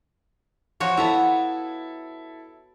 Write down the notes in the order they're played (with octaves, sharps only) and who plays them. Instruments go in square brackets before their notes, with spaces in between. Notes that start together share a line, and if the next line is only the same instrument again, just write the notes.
[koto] F3 F#4 C#5
[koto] B3 E5 A#5 [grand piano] E4 A4